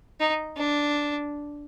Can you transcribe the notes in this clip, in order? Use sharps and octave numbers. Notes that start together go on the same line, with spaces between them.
D#4
D4